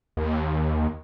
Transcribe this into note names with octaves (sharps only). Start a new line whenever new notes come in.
D#2